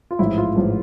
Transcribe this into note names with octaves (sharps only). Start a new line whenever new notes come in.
F4
A1 G#2 F3 E4
F4
A1 G#2 F3